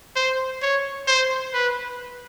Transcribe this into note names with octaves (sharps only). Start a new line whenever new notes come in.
C5
C#5
C5
B4